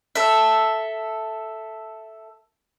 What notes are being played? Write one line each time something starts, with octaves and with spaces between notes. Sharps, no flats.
A4 E5